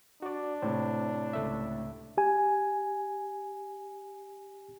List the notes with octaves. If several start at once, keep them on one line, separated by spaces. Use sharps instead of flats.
D4 F#4 D5
A2 C3 C5
C#2 A3 E5
G4 G#5